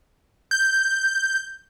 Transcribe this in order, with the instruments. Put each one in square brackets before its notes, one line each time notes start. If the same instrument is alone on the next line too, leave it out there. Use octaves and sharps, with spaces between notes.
[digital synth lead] G6